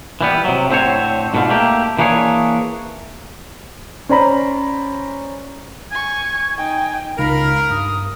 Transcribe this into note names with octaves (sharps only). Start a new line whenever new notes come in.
E3 G3 B3
C3 F#3
A2 D3 C4 G4 C5 C#5
G#2 B2 D3 F4
A3 A#3 G4
E3 A#3 D4 G#4 C#5
C#4 C5 D5 A#5 B5
G#5 C#6 G#6
D#4 G5 G#5
C#2 C#3 D#4 A#4 F5 B5
G2 D#6